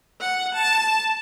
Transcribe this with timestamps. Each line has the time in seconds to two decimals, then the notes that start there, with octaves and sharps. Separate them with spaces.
0.20 F#5
0.55 A5